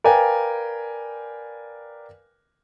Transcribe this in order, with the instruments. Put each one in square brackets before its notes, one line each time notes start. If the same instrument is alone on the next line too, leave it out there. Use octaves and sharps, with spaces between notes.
[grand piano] A#4 B4 D5 F5 G5 G#5